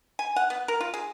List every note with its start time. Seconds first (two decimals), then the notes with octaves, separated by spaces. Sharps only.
0.19 G#5
0.36 F#5
0.50 B3
0.68 A#4
0.81 F4
0.94 G#4